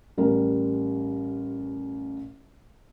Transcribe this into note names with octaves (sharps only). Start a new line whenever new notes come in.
A1 G3 A#4